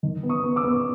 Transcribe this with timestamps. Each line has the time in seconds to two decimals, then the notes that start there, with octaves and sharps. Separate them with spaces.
0.03 D#3
0.23 B3
0.29 C#6 D#6
0.43 B3
0.56 D6 E6
0.64 B3